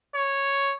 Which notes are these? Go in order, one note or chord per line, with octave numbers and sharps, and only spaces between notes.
C#5